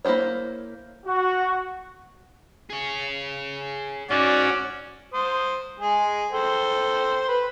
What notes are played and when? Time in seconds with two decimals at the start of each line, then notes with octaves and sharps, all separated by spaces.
0.05 A#3 E4 A4 C5 C#5
1.06 F#4
2.70 G#4 C#5
4.10 G#2 C#4 F#4 D5
5.14 C5 D#6
5.80 G#3 G#4
6.31 A4 C5 G5
7.28 B4